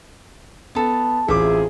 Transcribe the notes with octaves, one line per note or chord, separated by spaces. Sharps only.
B3 A4 A5
A1 C3 F4 G#4 E5 D6